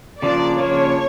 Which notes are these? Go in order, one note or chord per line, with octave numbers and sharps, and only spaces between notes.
C#3 F3 A#3 D4 D5
C#3 F3 A#3 D4 C#5